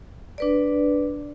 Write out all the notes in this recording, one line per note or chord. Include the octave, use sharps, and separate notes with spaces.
D4 B4 D5